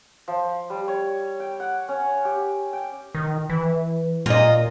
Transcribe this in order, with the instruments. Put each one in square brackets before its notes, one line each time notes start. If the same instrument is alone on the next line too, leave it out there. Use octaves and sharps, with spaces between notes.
[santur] F3
G3
C#5
G5
F#5
C#4
G4
G5
[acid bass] D#3
E3
[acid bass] A#2 [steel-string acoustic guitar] F4 D#5